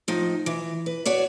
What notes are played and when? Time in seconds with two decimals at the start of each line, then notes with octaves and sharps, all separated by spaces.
0.08 A2 F3 D#4
0.46 E3
0.86 B4
1.05 F#4 C#5 D5